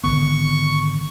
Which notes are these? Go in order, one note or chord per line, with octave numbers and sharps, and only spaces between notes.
G#1 D3 B3 C#6